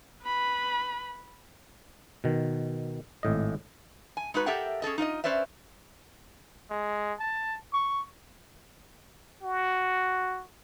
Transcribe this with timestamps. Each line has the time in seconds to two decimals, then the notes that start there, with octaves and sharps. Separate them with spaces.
0.23 B4 B5
2.24 B2 D#3
3.23 G#1 A2 D#5
4.17 G#5
4.34 G#3 D#4 F#4 B4
4.46 G4 A4 A#4 E5 F#5 G5
4.82 C#4 G#4 A4 D#5
4.98 D#4 F4 D5 D#5
5.24 C#4 B4 C5 D5 E5
6.70 G#3
7.19 A5
7.73 C#6
9.43 F#4